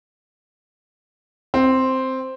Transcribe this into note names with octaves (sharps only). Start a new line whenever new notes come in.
C4